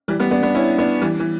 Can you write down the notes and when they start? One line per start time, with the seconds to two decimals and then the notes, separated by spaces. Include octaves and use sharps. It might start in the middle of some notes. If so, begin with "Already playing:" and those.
0.08 E3 G3
0.20 G3 B3
0.31 B3 D4
0.42 B3 D4
0.55 C#4 E4
0.78 B3 D4
1.01 E3 G3
1.20 E3